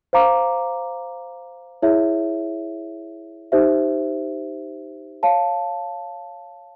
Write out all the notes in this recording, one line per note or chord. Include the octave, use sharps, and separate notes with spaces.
C5 F5 A#5 D6
E4 G#4 C#5 E5
D#4 G4 C5 E5
C#5 F5 A5